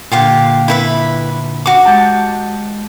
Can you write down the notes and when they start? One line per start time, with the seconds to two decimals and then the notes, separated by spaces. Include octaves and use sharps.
0.12 A#2 D3 F4 G4 F5
0.68 E4 B4 E5
1.66 F#4 D6
1.85 G#3 G4 A5